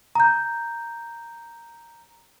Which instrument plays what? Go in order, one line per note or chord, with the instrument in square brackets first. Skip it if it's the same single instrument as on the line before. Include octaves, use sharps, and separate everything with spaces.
[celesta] A#5 G6